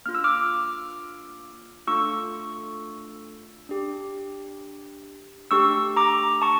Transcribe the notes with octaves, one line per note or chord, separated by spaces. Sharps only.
A#3 D4 F4 F6
E6
D6 F6
A3 D4 F4 A4 C#6 E6
D4 G4
A3 D4 G4 C#6 E6
A#5 D6
A5 C#6